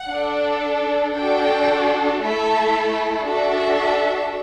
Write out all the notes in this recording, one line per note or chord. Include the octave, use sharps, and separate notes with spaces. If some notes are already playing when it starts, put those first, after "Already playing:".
Already playing: F#5
D4 A4
D4 F#4 A4 G5
A3 E4 A4 E5
D4 F#4 A4 E5